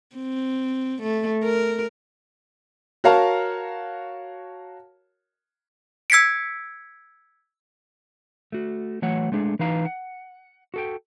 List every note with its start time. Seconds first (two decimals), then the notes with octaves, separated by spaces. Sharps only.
0.16 C4
1.03 A3
1.45 A#4
3.04 F#4 A#4 C#5 F5 A5 A#5
6.10 E6 G#6 B6 C#7 D7
8.52 A3 F#4
9.02 E3 F#3 A3 C#5 F#5
9.32 G#3 A3 D4 G4 G#4
9.59 E3 D#4 B4 F5 A#5
9.85 F#5
10.74 F#4 A4 G5